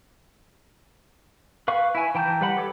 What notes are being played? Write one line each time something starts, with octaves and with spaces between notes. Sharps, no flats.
B4 F5 C#6
E4 G#5
E3 G5 A5 A#5 G6
G3 B4 F#5 B5
G4 A4 C#5 D6